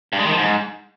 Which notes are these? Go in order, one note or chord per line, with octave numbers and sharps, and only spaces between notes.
G2
G#3
D#3
F3
G#2